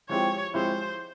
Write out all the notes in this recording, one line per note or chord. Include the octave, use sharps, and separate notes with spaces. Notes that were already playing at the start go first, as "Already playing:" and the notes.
F3 G#3 C4 E4 G4 C#5
F3 G#3 C4 E4 G4 C5